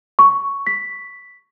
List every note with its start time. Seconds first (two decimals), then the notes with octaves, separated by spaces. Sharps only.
0.19 C#6
0.67 B6